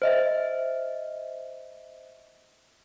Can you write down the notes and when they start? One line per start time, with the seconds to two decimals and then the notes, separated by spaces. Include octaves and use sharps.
0.02 C5 D#5 E5